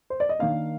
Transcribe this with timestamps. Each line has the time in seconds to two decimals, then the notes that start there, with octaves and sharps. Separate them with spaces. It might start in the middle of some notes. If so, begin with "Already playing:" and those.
0.10 C5
0.20 D5
0.29 D#5
0.39 D#3 A#3 D4 F5